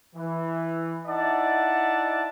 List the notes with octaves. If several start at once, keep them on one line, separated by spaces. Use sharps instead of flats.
E3
D#4 E4 D5 E5 F#5 A5